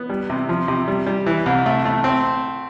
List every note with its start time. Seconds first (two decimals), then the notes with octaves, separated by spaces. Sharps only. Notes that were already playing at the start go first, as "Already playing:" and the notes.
Already playing: B3
0.09 G3
0.30 C3
0.49 F3
0.68 C3
0.88 G3
1.06 G3
1.26 E3
1.46 C2
1.66 A3
1.85 A3
2.04 C4